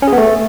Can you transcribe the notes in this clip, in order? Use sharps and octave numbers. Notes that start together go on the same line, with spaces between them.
C#4
G#4
B3
A3